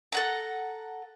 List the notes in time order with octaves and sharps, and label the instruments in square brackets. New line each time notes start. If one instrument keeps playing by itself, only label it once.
[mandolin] A4 F#5 A#5